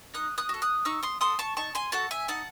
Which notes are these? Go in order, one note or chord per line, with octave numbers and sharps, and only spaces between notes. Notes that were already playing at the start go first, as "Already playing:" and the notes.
D#4 D#6 F#6
D#6 F#6
F#4 A4
D#6 F#6
D#4 C#6 E6
C6 D#6
F#4 A4 C6 D#6
A5 C#6
D#4 A5 C#6
G#5 C6
F#4 A4 F#5 A5
E5 G#5
D#4 F#5 A5